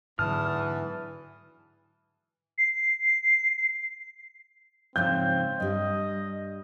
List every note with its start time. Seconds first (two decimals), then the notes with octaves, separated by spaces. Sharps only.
0.19 E2 G#2 D3 E3 F#3 A5 D#6 F6
2.58 C7
4.96 G#2 C#3 F3 C4 G6
5.60 G2 G3 D#5